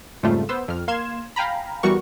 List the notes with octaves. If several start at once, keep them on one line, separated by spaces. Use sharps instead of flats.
F2 G#2 C#3 G3 A3 F4
B3 C5 E6
F2 F6
A#3 F5 C6 G#6 E7
F5 G5 G#5 A#5 B5
E2 G3 B3 F#4 A#4 C#6